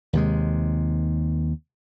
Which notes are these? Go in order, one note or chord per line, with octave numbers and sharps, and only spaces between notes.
D#2 C3 G#3